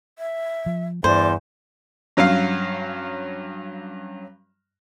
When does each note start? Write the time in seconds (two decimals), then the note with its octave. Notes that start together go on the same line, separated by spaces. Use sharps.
0.19 E5
0.66 F3
1.04 E2 G2 C5 D5
2.17 G2 F#3 C#4 F5